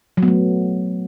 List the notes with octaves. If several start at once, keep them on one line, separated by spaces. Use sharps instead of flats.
F#3
B3
A3